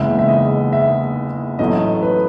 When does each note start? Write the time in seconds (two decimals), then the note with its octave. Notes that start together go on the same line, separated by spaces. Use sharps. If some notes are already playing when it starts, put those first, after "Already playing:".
Already playing: F#1 E2 C#3 G#3 E5
0.19 E5
0.28 D#5
0.72 E5
1.59 A1 A2 F#3 A3 D#5
2.02 B4